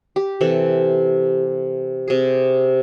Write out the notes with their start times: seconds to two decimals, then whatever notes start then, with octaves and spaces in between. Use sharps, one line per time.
0.16 G4
0.41 C3 E3 A4
2.08 C3 G#4